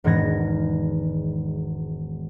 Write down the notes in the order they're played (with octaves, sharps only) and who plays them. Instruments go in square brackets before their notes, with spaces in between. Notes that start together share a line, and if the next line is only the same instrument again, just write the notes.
[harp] E1 G#2 D#3 B3 G#6 A#6